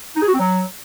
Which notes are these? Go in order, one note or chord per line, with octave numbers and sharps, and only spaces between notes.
D#4
G#4
F#4
C4
F#3